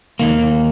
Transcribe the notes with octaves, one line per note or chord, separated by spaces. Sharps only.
D#2 D#3 A#3